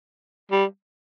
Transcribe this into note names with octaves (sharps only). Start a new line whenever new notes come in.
G3